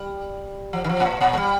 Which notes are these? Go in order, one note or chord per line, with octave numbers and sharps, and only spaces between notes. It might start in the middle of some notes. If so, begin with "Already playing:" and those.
Already playing: G3
F3
D#3
F3
A#2
A2
A#2
A3
G3